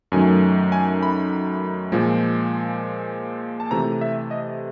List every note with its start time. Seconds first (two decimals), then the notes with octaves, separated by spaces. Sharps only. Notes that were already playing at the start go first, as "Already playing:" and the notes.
0.12 F#2 D#3 F#3 A3 G#5
0.72 G#5
1.03 B5
1.92 A#2 F3 G#3
3.60 A5
3.71 C3 E3 A3 A#5
4.01 E5
4.31 D#5